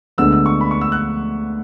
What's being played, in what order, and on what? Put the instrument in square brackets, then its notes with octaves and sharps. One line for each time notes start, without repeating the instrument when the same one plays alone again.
[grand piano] D2 D3 G#3 B3 D4 E6
E6
C#6
B5
C#6
E6
F#6